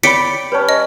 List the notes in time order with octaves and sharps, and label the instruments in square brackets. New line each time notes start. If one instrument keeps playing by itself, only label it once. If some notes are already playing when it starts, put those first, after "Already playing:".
[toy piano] C#5 B5 [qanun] D5 G5 [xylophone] B6 C#7 D7
[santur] G3 C#4 [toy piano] B4 C#5 A5
[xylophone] D#5